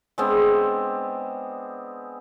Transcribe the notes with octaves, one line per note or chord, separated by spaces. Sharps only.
G#3 B3 C4 D4